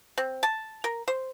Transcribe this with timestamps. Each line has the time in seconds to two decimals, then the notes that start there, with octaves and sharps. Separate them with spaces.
0.18 C4
0.43 A5
0.84 A#4
1.08 C5